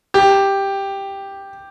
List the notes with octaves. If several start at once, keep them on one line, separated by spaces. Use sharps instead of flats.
G4